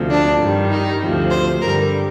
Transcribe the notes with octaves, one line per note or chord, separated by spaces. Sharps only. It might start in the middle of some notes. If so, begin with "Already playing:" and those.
Already playing: D2 C3 F3
D4
G2 D#3 G3
D#4
D2 C3 F3
C5
G2 D3 G3 A#4